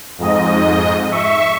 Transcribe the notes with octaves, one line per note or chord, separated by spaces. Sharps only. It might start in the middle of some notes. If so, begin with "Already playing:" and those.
F2 G#2 D#5
E5 C#6